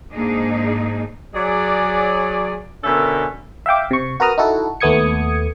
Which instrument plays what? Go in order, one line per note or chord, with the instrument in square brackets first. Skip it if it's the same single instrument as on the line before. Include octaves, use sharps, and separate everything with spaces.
[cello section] G#2 G#3 A#3 D4 D#4 G#4
[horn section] F#3 G#4 D5
B2 D3 C#4 A4 A#4 E5
[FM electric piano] E5 F5 G5 D6
C3 C#6
F#4 A#4 B4 A#5 D#6 F6
D#4 E4 F#4 A4
D#2 A3 B3 D#6 G#6 C#7